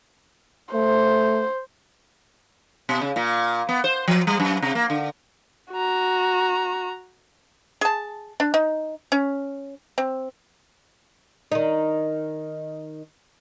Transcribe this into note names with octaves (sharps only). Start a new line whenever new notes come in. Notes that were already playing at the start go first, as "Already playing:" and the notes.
A3 C5
B2
C#3
A#2
B3
C5
F3
G3
F#2
C3
A#3
D3
F#4 A#5
G#4 A5
D4
D#4
C#4
C4
D#3 D#4